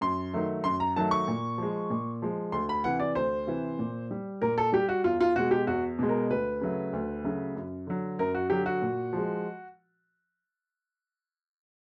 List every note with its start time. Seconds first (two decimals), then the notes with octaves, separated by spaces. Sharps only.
0.01 F#2 C6
0.34 D#3 F#3 A3
0.64 F#2 C6
0.80 A#5
0.96 D#3 F#3 A3 A5
1.11 C#6
1.28 A#2
1.58 F3 G#3
1.90 A#2
2.22 F3 G#3
2.52 D2 C6
2.69 B5
2.84 C3 E3 F#5
3.00 D5
3.15 D2 C5
3.47 C3 E3
3.79 A#2
4.11 G3
4.42 A#2 A#4
4.58 A4
4.72 G3 G4
4.89 F#4
5.04 E2 F4
5.21 F4
5.36 B2 G#3 F#4
5.51 G4
5.67 E2 F#4
5.99 B2 G#3
6.09 A#4
6.30 D2 B4
6.61 C#3 F#3 A3
6.93 D2
7.24 C#3 F#3 A3
7.55 F#2
7.87 D3 F#3
8.19 F#2 A#4
8.35 F#4
8.50 D3 F#3 G4
8.66 F#4
8.82 A#2
9.13 F3 G#3